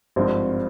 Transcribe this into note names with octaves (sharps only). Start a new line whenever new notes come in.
G#1 G2 F3 C4